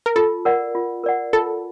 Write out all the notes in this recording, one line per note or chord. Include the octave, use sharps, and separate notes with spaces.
A#4
F4 A4
A#4 D5 F#5
F4
A#4 D5 F#5
F4 A4